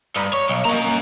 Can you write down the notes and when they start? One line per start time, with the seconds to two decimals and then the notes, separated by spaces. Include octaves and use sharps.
0.16 G2 A#5 B5 D#6
0.33 C#5
0.49 B1
0.65 A#3 C#4 D#5 A#5